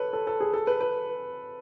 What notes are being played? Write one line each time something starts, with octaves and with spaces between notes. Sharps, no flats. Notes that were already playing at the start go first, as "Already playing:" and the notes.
Already playing: A4 B4 C#5
A4
A4
G#4
A4
B4
B4